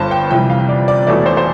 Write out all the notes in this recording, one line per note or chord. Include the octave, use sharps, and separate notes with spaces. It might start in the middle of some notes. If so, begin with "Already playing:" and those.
Already playing: G1 G2 D3 C5 A5
G5
F2 C3 E3 G3 G5
F5
D5
D5
E1 E2 B2 A3 D5
C5
C5